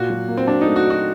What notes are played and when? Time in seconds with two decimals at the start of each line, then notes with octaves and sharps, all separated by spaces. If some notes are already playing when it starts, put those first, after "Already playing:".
Already playing: A#2 F#4
0.10 F#3
0.28 A#3
0.37 C4
0.47 F#3 D4
0.61 A3 D#4
0.76 F#4
0.85 D#4
0.90 F#4